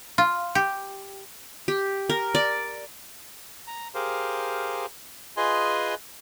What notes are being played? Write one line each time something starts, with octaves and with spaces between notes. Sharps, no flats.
F4
G4
G4
A#4
D5
A#5
G4 G#4 A#4 C5 F5
F4 G#4 B4 D#5 G#5 C6